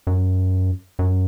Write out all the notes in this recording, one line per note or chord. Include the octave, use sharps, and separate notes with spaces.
F#2
F#2